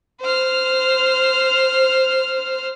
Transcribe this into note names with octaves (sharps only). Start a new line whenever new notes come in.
C5 F6